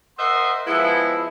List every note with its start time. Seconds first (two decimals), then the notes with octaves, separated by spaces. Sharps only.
0.18 A#4 C5 D#5 E5 F#5 C6
0.67 F3 G#3 B3 E4